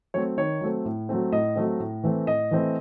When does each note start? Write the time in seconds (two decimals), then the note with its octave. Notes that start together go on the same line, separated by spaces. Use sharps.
0.14 F#3 A3 C4 C#5
0.37 D#3 C#5
0.61 F#3 A3 C4
0.85 A2
1.09 F#3 A3 C4
1.32 A2 D#5
1.56 F#3 A3 C4
1.80 A2
2.04 E3 A3 C4
2.27 A2 D#5
2.51 E3 A3 C4